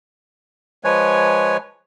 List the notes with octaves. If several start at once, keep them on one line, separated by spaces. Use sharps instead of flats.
F3 G#3 B4 C#5 G#5